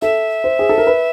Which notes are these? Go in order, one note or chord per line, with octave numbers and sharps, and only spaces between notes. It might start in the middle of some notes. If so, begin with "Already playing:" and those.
A4 E5
C5
G#4
A4
A#4
B4